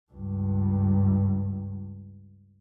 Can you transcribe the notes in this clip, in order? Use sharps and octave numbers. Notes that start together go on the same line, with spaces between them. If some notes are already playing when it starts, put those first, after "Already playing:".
C#2 G2